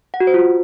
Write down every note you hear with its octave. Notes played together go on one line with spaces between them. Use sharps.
F#5
F#4
C5
F4